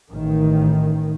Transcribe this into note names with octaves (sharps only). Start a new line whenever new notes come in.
A1 D#3